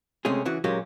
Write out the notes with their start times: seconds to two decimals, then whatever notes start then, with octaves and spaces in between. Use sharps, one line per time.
0.25 C3 G#3 A3 C#4 G#4
0.45 C#3 E3 F#4
0.64 A#2 F#3 G#3 A#3 C#4 G4